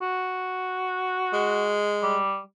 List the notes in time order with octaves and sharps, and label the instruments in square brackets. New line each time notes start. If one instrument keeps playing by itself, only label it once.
[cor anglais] F#4
[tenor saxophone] G#3
[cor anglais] G3